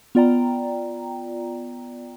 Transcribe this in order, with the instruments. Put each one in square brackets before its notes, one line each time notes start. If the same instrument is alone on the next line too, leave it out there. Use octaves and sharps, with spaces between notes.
[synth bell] B3 F4 D5 G5 A#5